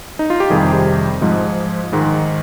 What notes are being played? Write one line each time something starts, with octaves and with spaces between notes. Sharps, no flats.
D#4
F4
G4
F2 C3 D#3 G3 G#4
G#2 F3 G#3
G#2 D#3 G#3